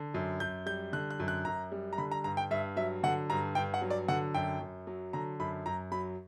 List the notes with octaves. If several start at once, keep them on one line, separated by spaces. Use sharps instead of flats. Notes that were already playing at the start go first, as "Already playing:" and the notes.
Already playing: D3
F#2
F#2 G6
G3 G6
D3 F#6
F#6
F#2
F#6
F#2 A#5
G3
A#5
D3 B5
A#5
G2 A#5
G5
G2 E5
F#3 E5
D3 F#5
G2 A#5
G2 G5
F#5
F#3
D5
D3 F#5
F#2 G5
F#2
F#3
D3 A#5
F#2 B5
F#2 A#5
F#3 B5